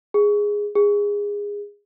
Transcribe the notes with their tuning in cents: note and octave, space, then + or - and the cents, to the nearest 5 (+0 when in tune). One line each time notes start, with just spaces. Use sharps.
G#4 -5
G#4 -20